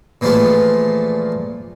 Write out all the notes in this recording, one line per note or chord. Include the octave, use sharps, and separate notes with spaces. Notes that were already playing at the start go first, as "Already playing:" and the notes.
A#2 E3 F3 G#3 A3 F4